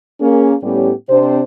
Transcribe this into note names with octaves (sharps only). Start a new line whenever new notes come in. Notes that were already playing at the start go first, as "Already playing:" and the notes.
A#3 C#4 G#4
A2 G3 B3 C#4 G4
C3 C4 D4 C5